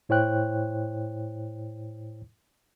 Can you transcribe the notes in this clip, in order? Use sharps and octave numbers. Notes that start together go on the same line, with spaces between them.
A2 E4 C5 C#5 G5 F#6